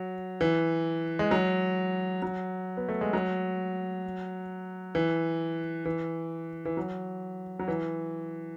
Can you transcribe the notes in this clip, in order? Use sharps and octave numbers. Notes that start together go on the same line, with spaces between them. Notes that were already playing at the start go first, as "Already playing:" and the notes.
Already playing: F#3
E3
G#3
F#3
F#3
B3
A3
G#3
F#3
E3
E3
E3
F#3
F#3
E3